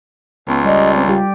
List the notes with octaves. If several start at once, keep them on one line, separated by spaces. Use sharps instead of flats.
C#2 B3
G3 D5 D#5
C4
G3 F4 G4